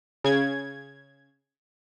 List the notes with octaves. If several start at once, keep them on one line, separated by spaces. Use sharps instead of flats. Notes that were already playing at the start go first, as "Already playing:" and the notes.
C#3 G#6